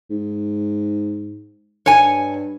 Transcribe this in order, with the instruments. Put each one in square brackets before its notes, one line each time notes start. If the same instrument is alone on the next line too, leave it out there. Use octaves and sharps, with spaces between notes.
[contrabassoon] G#2
[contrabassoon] G2 [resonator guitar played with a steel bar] C#5 G#5